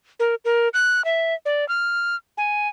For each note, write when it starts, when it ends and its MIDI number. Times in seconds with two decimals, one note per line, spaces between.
0.20 0.35 70
0.45 0.69 70
0.74 1.04 90
1.05 1.34 76
1.46 1.67 74
1.69 2.16 89
2.38 2.68 80